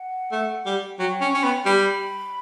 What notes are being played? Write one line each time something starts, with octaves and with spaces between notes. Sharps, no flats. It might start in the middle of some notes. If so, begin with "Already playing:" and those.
Already playing: F#5
A3
G3
F#3 G5
C#4
C#4
B3
G3 B5